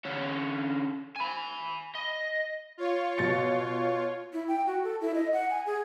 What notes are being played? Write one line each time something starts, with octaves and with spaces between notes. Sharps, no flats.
D3 C#4
G#5 B5
D#5
F4 C#5
B2 A6 C#7
E4
G5
F#4
A4
E4
D#5
F#5
G#5
G#4